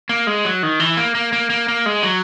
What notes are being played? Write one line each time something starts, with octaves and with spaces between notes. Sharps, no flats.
A#3
G#3
F#3
D#3
E3
A#3
A#3
A#3
A#3
A#3
G#3
F#3